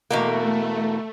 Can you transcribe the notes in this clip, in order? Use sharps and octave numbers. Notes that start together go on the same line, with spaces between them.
E2 B2 A3 A#3